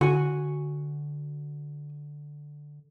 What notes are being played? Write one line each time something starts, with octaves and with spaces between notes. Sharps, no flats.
D3 F#4 G#5